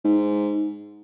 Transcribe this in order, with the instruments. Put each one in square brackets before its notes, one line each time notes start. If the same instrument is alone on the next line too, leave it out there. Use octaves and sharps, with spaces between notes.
[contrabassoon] G#2